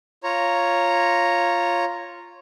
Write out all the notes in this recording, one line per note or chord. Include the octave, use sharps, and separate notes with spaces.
F4 C#5 A#5